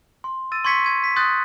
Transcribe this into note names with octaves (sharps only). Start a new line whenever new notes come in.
C6
E6 A6 D#7
C6 C#6 G#6 B6 C#7
G#6 D#7
B6
C6 D#6 F#6 G6 A6